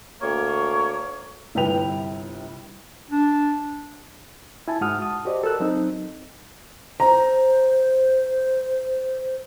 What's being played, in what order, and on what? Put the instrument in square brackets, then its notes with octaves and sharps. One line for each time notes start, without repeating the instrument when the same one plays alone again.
[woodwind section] D2 A#3 C#5
[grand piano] G1 C2 B4 G5 F7
[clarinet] D4
[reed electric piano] E4 G#5 A5
G#2 F#4 F#5 D#6 F6
A5 D#6
F#4 G4 C5 D5 D#5
A4 A#4 E6 F#6
F#3 C4 D#4
[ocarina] C5 [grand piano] A#5